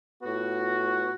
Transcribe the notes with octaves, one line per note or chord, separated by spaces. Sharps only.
A2 B3 F4 F#4